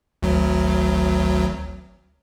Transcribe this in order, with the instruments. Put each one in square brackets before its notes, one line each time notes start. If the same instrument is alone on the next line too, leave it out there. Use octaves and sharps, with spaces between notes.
[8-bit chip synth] G#1 D2 F#3